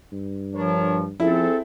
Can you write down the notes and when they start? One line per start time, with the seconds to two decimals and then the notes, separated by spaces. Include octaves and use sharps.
0.12 G2
0.54 F3 D4 A#4 C#5
1.20 F3 C4 E4 G#4 A4